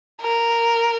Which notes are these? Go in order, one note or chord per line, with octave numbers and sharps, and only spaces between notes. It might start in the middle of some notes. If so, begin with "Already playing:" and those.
A#4